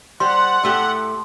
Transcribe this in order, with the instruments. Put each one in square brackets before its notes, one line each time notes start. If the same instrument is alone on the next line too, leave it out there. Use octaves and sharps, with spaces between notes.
[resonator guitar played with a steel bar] G3 C5 [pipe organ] F#5 [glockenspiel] C6
[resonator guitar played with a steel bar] A2 A3 G4